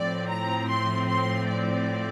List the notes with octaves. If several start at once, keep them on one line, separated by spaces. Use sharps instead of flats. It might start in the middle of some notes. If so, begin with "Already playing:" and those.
Already playing: A2 F3 C4 D5
A#5
C6
C6
D5